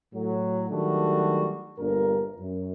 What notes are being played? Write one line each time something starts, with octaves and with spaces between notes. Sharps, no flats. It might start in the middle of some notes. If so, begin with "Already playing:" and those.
A2 F#3
D#3 F#3 G3 A3 D4 F#4
G1 G2 A#2 A#4
F#2